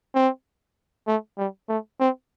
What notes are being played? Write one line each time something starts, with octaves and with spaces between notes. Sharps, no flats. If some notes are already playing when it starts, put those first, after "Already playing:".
C4
A3
G3
A3
C4